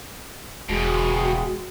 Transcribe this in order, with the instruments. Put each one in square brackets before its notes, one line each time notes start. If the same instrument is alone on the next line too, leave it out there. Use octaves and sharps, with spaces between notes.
[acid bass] E1 [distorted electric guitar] D2 B2 [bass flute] G#3 [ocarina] F#4